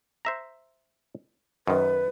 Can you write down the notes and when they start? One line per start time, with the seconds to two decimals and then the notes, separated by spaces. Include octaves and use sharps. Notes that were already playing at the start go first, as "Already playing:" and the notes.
0.25 C5 E5 A#5
1.67 F#2 D#3 B4